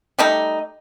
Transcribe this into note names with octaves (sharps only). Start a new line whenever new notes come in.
G3 A3 D#4